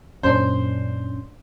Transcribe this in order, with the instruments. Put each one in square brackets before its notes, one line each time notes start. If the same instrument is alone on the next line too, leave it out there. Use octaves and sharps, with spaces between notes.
[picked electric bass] F#2 A#2 [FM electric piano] C#4 D4 [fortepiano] C5